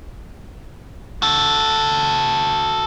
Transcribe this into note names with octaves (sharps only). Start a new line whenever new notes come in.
F#4 A4